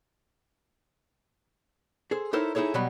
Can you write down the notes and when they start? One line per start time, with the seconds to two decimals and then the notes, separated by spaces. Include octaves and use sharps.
2.11 G#4 A4 C5
2.33 D#4 E4 A4 A#4 C5 C#5
2.55 D#4 E4 G#4 A4 C#5
2.74 B2 F#3 G3 F#5 B5